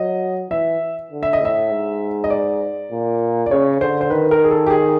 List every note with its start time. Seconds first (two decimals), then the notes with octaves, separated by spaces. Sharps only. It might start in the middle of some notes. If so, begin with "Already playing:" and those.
Already playing: F#3 D#5
0.50 E3 E5
1.11 D3
1.23 E5
1.33 D#5
1.41 A2 E5
1.71 G#2
2.24 D#5
2.30 D5
2.91 A#2
3.46 D5
3.50 C#3 C#5
3.81 D3 C5
4.01 C5
4.10 D#3 B4
4.31 A#4
4.44 G#4
4.51 A4
4.66 G4
4.70 G#4